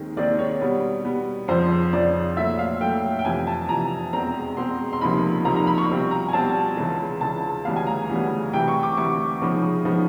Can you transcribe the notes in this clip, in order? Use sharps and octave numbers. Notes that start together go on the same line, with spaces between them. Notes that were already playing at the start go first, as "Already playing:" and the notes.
Already playing: D#2 D#3 G#3 C4 D#4
D#2 D#3 G#3 C4 D#4 D5
C#5
B2 G3 B3
B2 G3 B3
F2 C#3 F3 C5
F2 C#3 F3 D5
A#2 F#3 A3 E5
F5
A#2 F#3 A3 G5
G5
F2 C3 E3 G#5
A5
F2 C3 E3 A#5
E2 B2 G#3 C4 A#5
E2 B2 G#3 C4 C6
C6
C#2 C3 F3 A#3 D#4 B5
C#2 C3 F3 A#3 D#4 A#5
A#5
B5
C#6
B2 G3 C4 F4
A#5
G#5
B2 G3 C4 F4 A5
C#2 C#3 E3 G#3
C#2 C#3 E3 G#3 A5
D2 C#3 E3 G3 B3 F5
G#5
A#5
D2 C#3 E3 G3 B3
D2 C3 E3 G5
C#6
D6
D2 C3 E3 C#6
C#3 F3 G#3 B3 D#4
C#3 F3 G#3 B3 D#4